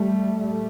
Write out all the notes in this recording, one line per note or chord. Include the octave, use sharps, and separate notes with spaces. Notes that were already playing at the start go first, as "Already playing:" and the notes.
Already playing: G3 A3
A#2 G3 A3